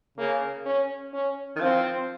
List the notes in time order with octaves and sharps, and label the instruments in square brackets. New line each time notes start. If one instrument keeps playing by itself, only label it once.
[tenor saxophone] C#3 [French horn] A#3
[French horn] C#4
C#4
[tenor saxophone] D#3
[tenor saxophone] F3 [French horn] C4